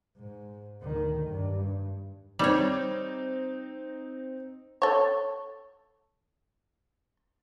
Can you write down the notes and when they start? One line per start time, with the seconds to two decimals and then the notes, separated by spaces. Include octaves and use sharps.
0.16 G#2
0.82 D2 D#3
1.26 G2
2.39 G3 C4 D#4 C#5
4.82 A4 C#5